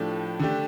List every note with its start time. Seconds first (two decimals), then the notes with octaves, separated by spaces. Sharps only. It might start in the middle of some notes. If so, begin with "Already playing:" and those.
Already playing: A2 F3 A3 D4 G4
0.40 D3 A3 D4 G4